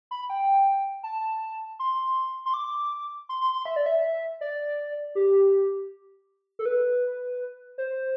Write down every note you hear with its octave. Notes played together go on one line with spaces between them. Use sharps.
B5
G5
A5
C6
C6
D6
C6
C6
C6
E5
D5
E5
D5
G4
A4
B4
C5